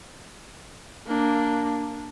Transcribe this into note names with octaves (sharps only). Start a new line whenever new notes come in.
A#3 D4